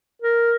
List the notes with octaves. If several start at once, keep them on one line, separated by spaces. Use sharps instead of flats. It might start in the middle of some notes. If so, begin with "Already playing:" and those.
A#4